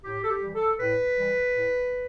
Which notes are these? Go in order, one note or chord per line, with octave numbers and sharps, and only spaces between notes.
A2 G4
A4
G4
E3 G3
A4
A2 B4
E3 G3
A2